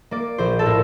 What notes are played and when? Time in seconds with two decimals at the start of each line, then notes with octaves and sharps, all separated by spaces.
0.11 A#3 D5
0.38 A#1 C5
0.59 A4
0.66 A2 A#4